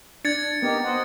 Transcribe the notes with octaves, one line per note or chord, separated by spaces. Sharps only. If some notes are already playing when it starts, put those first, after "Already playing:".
D4 G#6 A6 C#7
B3 D#4 G4 A#4
C5 D#5 F#5